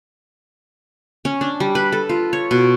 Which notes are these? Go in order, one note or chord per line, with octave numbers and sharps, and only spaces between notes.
C#4
D4
G3
B4
A4
F4
C#5
B2